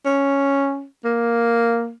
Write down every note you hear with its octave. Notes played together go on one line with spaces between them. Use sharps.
C#4
A#3